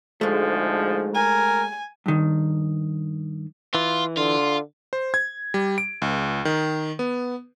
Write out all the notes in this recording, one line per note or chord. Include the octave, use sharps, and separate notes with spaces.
D2 G#2 F3 G#3 A3
A#4 G#5
G2 D#3
E3 F4
D3 F4
C5
G#6
G3
D7
C#2
D#3
B3